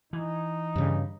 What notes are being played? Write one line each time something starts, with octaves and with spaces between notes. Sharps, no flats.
E3 D#4
G2 C#3